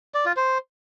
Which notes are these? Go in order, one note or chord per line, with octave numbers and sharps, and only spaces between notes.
D5
F4
C5